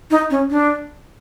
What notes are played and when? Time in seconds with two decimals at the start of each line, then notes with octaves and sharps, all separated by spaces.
0.11 D#4
0.30 C#4
0.50 D4